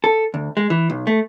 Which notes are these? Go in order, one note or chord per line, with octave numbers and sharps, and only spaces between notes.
A4
D2
G#3
E3
B1
A3